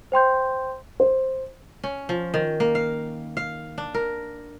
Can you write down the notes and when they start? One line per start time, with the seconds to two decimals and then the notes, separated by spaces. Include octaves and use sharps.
0.12 C5 G5 C6 G6
1.00 C5
1.84 C#4
2.09 F3
2.34 D#3
2.60 A#3
2.75 F5
3.37 F5
3.78 D4
3.94 A#4